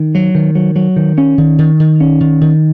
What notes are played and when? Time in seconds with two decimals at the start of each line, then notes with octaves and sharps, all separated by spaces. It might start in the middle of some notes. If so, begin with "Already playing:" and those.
Already playing: D#3
0.15 F#3
0.35 D#3
0.55 F#3
0.76 F#3
0.96 D#3
1.18 C#4
1.38 D#3
1.59 D#3
1.80 D#3
2.00 C#4
2.21 D#3
2.41 D#3